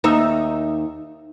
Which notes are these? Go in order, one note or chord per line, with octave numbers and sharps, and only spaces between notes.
D#2 D#4 E5